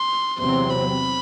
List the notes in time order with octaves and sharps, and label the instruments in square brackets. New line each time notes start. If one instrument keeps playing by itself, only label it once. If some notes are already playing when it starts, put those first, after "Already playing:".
Already playing: [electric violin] C6
[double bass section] E2 C3 F#3 C4 [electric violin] C6
[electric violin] B5